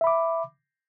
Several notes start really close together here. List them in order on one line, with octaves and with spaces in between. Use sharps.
E5 B5 D6